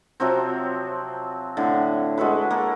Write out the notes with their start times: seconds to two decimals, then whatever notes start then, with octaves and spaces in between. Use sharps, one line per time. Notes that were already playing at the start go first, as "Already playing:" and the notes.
0.20 C3 F3 F#3 C4
1.57 A2 D3
2.17 G#3 F#4 A4 B4
2.51 A#3 A4